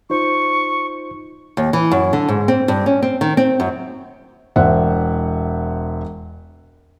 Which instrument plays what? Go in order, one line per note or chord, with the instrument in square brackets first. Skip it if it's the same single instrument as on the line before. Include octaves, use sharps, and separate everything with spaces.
[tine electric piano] D#4 F4 C5 [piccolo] C#6
[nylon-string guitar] D#2
E3
F#2
D3
G#2
C4
G2
C#4
C4
D#3
C4
F#2
[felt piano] E1 C5 E5 F#5